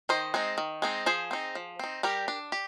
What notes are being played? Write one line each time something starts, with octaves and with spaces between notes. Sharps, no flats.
D#3 C5 D#5
G#3 C4 D#4
D#3
G#3 C4 D#4
F3 G#4 C5
C4 D#4
F3
C4 D#4
G3 G4 A#4
D4
G4